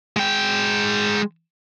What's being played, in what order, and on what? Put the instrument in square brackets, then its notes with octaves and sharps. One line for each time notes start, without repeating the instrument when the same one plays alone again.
[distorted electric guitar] G#3 G5